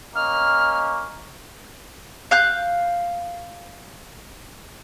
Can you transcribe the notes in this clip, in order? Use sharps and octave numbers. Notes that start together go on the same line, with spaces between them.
A#3 C#4 D#5 F6
F5 F#6 G6